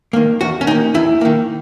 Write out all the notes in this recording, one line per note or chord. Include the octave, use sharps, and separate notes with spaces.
D#3 A#3
E2 F#4
C#4
D#3 A#3 D#4
E2 E4
D#3 A#3